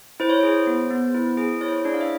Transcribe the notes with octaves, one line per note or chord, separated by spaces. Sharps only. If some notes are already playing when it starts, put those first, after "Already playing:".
E4 C5
C#5
G#4 C5
B3
B3
E4
G#4
E4 C#5
C5
C#5
D4 G#4 D5
F5
E5